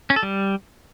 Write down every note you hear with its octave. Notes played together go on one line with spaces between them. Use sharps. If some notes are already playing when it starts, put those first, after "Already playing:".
C#4
A4
G3